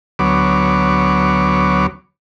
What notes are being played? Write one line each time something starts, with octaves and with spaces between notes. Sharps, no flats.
D2 F#3 B3 C#5 D6